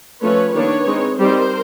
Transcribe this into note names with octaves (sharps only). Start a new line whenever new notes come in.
F3 A3 C#4 B4 C#5
D#3 G3 A#3 D4 B4 C#5
G#3 C4 D#4
G3 C4 D#4 A#4 C5